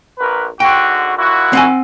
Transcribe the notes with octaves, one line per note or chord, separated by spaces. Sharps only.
A#1 A#4 B4
G#2 D3 F#4 G5
A#2 E4 F#4
C4 F#5 G#5